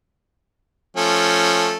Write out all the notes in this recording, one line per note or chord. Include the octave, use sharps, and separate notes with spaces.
F3 A3 C#4